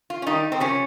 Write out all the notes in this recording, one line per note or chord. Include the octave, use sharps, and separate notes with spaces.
F4
C#4
D#3 G3 A#3 D#4
C4
C3 F3 A#3 C#4